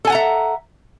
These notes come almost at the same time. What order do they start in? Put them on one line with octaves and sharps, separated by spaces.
A4 G#5 F#5 A#5 E5